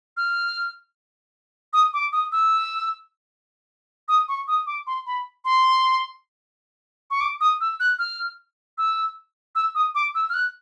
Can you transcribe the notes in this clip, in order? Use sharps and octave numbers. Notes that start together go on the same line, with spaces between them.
F6
D#6
D6
D#6
E6
D#6
C#6
D#6
D6
C6
B5
C6
C#6
D6
D#6
E6
F#6
F6
E6
E6
D#6
D6
E6
F6
F#6